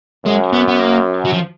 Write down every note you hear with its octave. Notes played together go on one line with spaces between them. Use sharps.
F#2 G#3
B3
B3
A#3
F#3
F3